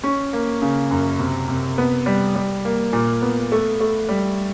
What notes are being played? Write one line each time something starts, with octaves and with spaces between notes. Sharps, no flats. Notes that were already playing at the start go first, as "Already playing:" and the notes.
C#4
A#3
C#3
F#2
C3
C3
B3
G3
G3
A#3
A#2
B3
A3
A3
G3